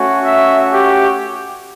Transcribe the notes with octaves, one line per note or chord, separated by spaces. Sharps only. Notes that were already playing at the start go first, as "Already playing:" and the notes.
Already playing: A3 C#4 F#4
E5
G4